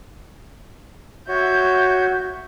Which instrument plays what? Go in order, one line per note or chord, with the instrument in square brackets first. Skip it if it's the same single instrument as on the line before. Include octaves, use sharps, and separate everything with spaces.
[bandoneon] F#4 C#5 [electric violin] E5 G6